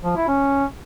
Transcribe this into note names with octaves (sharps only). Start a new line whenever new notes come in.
F3
E4
C#4